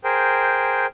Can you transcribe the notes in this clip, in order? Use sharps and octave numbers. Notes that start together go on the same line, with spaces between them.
G#4 A#4 C5 G5